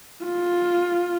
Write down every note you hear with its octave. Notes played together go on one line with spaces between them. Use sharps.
F4